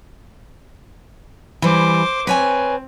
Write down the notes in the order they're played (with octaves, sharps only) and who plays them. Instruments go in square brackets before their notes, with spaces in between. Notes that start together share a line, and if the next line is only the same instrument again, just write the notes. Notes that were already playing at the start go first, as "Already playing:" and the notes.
[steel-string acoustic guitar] E3 G3 [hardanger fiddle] C5 D6
[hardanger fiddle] C4 [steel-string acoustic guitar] B4 C#5 G#5